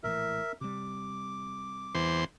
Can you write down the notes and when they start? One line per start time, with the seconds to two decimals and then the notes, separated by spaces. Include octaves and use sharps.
0.04 A#1 A2 E3 A#4 E5
0.61 C3 G3 D6
1.95 E2 C5